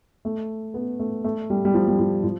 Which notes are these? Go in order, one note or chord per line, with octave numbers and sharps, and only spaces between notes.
A3
B3
A3
A3
G3
G3
F3
G3
F3
F3